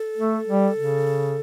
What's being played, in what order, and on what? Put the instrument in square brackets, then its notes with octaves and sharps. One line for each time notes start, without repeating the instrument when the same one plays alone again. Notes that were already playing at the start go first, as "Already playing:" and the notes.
Already playing: [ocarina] A4
[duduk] A3
G3
C#3